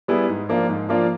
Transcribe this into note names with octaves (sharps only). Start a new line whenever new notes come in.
G3 B3 E4 G#4
G#2
F3 A#3 D4 F4
G#2
F3 A#3 D4 F4